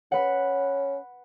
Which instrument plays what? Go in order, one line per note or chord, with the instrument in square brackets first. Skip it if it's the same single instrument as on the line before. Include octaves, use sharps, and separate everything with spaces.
[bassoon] C#4 [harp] B4 F#5